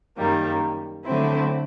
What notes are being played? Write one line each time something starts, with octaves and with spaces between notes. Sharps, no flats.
F#2 D#3 G3 A#3
D3 F#3 A3 C4 E4